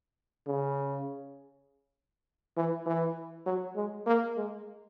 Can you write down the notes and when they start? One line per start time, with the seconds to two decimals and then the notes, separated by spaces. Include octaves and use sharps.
0.47 C#3
2.57 E3
2.86 E3
3.46 F#3
3.76 G#3
4.07 A#3
4.37 G#3